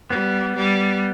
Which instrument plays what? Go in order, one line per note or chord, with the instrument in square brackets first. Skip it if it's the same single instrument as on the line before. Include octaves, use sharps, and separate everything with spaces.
[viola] G3 [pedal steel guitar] B3
[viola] G3